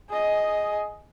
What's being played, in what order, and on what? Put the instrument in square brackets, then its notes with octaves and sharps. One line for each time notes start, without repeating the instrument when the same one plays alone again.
[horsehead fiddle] G#4 D#5